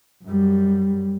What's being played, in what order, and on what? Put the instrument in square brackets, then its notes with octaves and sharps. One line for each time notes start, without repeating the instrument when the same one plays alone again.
[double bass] F#2 G3